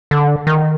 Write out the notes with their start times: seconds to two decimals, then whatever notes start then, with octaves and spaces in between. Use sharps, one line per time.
0.11 D3
0.47 D#3